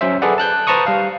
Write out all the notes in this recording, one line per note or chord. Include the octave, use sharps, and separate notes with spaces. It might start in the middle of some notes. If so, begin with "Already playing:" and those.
F#3 C#4 C5 E5
G#4 A4 B4 D5 F#5
A5 F#6 G6
B4 C5 A5 A#5 C#6 D#6
G3 F5